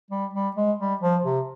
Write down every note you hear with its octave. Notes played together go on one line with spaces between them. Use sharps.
G3
G3
G#3
G3
F3
C3